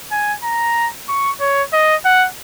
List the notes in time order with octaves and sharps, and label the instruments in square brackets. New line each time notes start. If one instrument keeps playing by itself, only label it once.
[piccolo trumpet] G#5
A#5
C#6
C#5
D#5
F#5